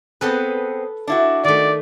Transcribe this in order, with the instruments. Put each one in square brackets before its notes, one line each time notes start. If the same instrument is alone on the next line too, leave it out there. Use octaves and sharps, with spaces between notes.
[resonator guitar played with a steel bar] B3 C4 G#4 [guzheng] A4 B4
[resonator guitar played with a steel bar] D4 E4 F#4
[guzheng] D#3 A3 [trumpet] D5